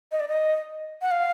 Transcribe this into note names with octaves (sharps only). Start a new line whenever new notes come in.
D#5
D5
D#5
F#5
F5